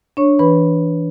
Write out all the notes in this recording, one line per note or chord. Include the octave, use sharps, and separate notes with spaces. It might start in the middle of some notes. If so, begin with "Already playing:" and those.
D4 C#5 C#6
E3 B4 B5